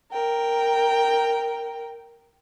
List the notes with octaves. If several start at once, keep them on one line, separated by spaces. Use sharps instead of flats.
A#4 G5